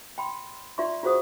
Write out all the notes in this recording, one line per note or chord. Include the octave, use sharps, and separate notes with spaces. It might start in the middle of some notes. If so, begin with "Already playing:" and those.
G5 B5 C6
F4 D5 E5 C6 C#6
F4 F#4 G#4 C5 F#5 D#6